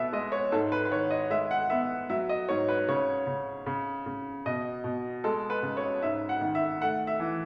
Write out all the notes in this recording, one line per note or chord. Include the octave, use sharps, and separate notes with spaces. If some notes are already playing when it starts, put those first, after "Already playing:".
Already playing: B2 B3 E5
G#3 D#5
C#5
G#2 A4
B4
B4
D#3 C#5
D#5
G#3 E5
F#5
B3 E5
F#3 E5
D#5
G#2 C#5
B4
C#3 C#5
C#3
C#3
C#3
B2 D#5
B2
G#3 A4
B4
C#3
C#5
G#2 E5
F#5
D#3
E5
A3 F#5
E5
E3